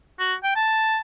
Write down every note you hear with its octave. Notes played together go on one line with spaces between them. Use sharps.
F#4
G5
A5